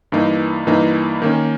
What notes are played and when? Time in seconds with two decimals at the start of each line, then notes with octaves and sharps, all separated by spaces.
0.12 G2 E3 A#3 D#4
0.67 G2 E3 A#3 D#4
1.22 D#3 A#3 C#4